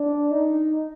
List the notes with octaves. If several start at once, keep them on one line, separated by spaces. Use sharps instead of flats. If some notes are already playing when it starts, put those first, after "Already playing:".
Already playing: D4
D#4